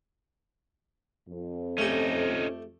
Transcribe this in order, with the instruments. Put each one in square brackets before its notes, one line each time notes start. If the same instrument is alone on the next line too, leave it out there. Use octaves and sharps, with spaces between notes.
[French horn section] F2
[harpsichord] A3 G4 [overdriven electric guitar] C#4 D#4